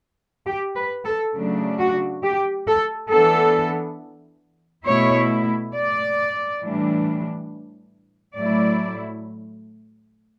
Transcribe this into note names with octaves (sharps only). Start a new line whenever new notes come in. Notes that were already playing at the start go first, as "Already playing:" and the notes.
G4
B4
A4
C#3 F#3 A3 D4
F#4
G4
A4
E3 B3 D4 A4
B2 A3 E4 C#5
D5
A2 E3 G3 D4
A2 F#3 A3 E4 D5